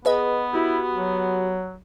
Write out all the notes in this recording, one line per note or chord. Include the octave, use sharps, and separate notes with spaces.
B3 G#4 B4 D#5
E4 F#4 G4
F#3